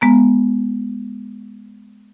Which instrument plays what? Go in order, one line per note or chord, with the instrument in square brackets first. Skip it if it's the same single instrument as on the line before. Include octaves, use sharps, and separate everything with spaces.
[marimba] G#3 B3 A#5